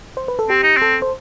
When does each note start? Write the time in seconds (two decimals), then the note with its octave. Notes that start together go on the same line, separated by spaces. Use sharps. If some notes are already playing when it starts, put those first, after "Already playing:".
0.17 C5
0.28 B4
0.39 A4
0.49 C4 G4
0.63 D#4
0.77 C4 A4
1.02 C5